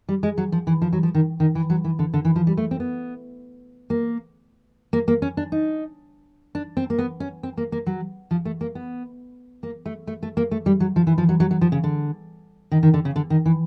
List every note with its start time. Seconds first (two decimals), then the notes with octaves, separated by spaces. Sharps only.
0.09 G3
0.23 G#3
0.38 F#3
0.52 F3
0.67 E3
0.82 F3
0.93 F#3
1.03 F3
1.15 D#3
1.40 D#3
1.55 E3
1.70 F#3
1.84 E3
1.99 D3
2.14 D3
2.25 E3
2.36 F3
2.47 G3
2.57 A3
2.71 C4
2.80 B3
3.90 A#3
4.93 A#3
5.08 A#3
5.22 C#4
5.37 D4
5.52 D#4
6.55 D4
6.77 C4
6.90 A#3
6.98 B3
7.20 C#4
7.43 C4
7.57 A#3
7.72 A#3
7.86 F#3
8.31 F3
8.45 A3
8.61 A#3
8.75 B3
9.63 A#3
9.86 A3
10.07 A3
10.23 A3
10.37 A#3
10.51 A3
10.66 G3
10.80 F#3
10.96 F3
11.07 E3
11.18 F3
11.29 F#3
11.40 F#3
11.51 F#3
11.61 F3
11.72 C#3
11.84 D3
12.72 D#3
12.83 D#3
12.94 D3
13.05 C#3
13.16 D3
13.30 D#3
13.46 E3